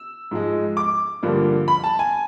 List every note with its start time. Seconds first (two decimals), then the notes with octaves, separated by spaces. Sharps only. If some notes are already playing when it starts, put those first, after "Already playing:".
Already playing: E6
0.31 G#2 F3 G#3
0.77 D6
1.23 G2 D3 F3 A#3 D4
1.68 B5
1.84 A5
1.99 G#5